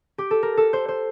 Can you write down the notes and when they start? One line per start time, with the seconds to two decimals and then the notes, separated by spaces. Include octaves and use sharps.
0.18 G4
0.31 A4
0.43 A#4
0.57 A4
0.73 C5
0.88 C5